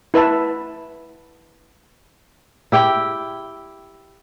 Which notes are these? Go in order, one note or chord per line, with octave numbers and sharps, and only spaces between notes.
E4 B4 E5 A5
E4 G4 G5